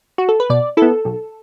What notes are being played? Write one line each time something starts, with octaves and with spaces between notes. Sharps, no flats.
F#4
A4
B4
B2 D5
B3 E4 A4
B1